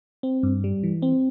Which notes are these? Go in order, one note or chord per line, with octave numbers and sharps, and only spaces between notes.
C4
G2
G3
E3
C4